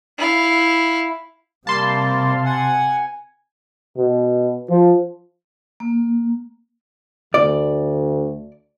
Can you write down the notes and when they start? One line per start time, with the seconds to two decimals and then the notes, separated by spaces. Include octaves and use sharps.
0.18 E4 F5
1.67 C3 G3 A#3 F5 A5 C6
2.45 F#5 G#5
3.97 B2
4.70 F3
5.80 A#3
7.34 D2 D5